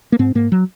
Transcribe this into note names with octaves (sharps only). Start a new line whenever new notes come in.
A#3
G#2 C4
G#2 A#3
F#3